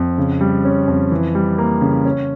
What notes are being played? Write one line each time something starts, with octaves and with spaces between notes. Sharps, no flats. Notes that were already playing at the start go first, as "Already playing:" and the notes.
Already playing: F2
C#3
G3
C#4
F2
E3
G3
A#3
C#3
C#4